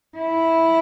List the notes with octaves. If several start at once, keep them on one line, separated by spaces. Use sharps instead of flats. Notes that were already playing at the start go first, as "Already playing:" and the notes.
E4